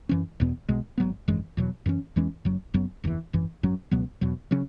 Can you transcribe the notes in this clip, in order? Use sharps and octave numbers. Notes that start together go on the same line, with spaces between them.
F#2 E3 C#4
E1 E2 B2 B3
B1 B2 G#3
G#1 F#2 F#3 B3
G#1 F#2 E3 G#3
E2 B2 F#3
F#2 E3 C#4
E2 E3 G#3 C#4
F#1 F#2 F#3
F#1 F#2 F#3 B3
F#1 E2 E3
G#1 F#2 E3
G#1 F#2 F#3 C#4
C#2 B2 F#3 B3
E2 B2 F#3
C#3 F#3 C#4